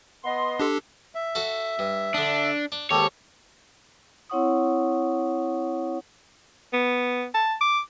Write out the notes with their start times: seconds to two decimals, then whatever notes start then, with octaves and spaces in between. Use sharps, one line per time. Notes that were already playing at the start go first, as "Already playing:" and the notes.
0.24 B3 D#5 C6
0.60 D4 G4 A4
1.15 E5
1.35 F#4 A4
1.79 G2
2.14 D3 D4 D#6
2.72 D4
2.91 D#2 G#2 G4 A4 C#5
4.30 C4 E4 C#5 F#5 C#6 D#6
6.73 B3
7.34 A5
7.61 D6